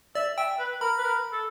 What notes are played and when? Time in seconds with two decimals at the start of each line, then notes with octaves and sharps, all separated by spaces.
0.15 D5 E5
0.37 E5 G5
0.59 B4
0.81 A#4 B5
0.98 B4
1.04 A#4
1.32 A4